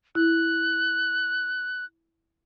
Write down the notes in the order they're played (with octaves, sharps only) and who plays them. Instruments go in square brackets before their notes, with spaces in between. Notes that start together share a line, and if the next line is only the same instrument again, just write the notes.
[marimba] E4 [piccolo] F#6